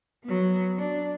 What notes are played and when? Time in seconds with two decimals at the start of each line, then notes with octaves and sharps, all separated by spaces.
0.24 F#3 B3
0.78 D4